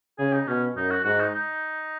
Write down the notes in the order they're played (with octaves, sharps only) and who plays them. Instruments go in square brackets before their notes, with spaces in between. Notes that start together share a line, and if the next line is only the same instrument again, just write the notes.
[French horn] C#3 [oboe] G#4
[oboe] D#4
[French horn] B2 [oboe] C#4
[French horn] F#2 [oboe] D#4
[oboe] F#4
[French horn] G#2 [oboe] F#4
[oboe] D#4
D#4